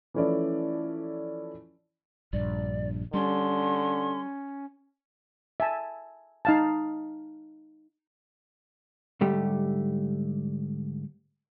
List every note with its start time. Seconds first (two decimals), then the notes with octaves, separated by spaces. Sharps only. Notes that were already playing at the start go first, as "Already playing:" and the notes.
0.14 E3 F3 A3 C#4 E4 D5
2.33 A#1 G2 D5
3.14 D3 G3 C#4 C6
5.60 E5 G#5 A5
6.45 D#4 F5 A5
9.21 G#2 D3 G3 A3 G4